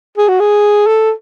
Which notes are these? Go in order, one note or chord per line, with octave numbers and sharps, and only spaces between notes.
G#4
F#4
G#4
A4